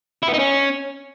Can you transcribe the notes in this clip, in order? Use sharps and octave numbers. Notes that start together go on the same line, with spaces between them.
E4
B3
D#4
C#4